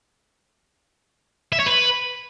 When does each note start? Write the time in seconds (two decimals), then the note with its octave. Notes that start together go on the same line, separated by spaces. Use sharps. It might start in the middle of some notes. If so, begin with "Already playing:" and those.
1.52 E5
1.59 C#5
1.66 B4